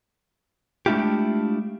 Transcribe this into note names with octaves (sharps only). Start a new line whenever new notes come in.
G#3 A3 D4 E4 F4 G4